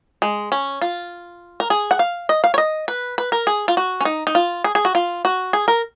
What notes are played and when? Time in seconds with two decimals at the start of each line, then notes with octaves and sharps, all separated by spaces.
0.22 G#3
0.52 C#4
0.81 F4
1.60 A#4
1.70 G#4
1.91 F#5
1.99 F5
2.29 D#5
2.44 F5
2.54 C#5
2.58 D#5
2.88 B4
3.18 B4
3.32 A#4
3.47 G#4
3.68 F4
3.77 F#4
4.01 C#4
4.05 D#4
4.27 D#4
4.35 F4
4.64 G#4
4.75 G#4
4.85 F#4
4.95 F4
5.25 F#4
5.53 G#4
5.68 A#4